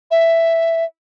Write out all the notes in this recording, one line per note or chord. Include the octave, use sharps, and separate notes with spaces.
E5